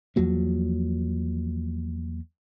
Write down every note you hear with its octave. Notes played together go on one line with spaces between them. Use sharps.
E2 F3 F#3 A#3